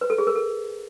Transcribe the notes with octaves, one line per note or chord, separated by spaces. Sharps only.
B4
A4
G#4
A#4
A4